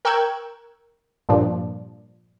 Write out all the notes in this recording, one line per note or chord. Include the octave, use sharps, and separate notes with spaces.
A#4 G5 C#6 E6 F#6 G#6
G2 A#2 F3 D4